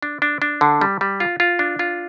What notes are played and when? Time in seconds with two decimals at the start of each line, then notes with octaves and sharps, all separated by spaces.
0.02 D4
0.22 D4
0.42 D4
0.61 D3
0.81 G3
1.01 G3
1.20 F4
1.40 F4
1.59 D4
1.79 F4